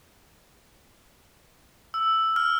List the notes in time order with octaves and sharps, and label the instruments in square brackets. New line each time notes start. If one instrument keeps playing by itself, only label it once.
[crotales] E6
F6